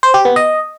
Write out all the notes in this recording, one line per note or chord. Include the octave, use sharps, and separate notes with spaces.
C5
G4
B3
D#5